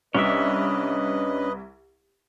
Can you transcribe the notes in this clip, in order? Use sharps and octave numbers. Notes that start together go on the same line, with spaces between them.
C2 C#4 D4 B4 D#5 E5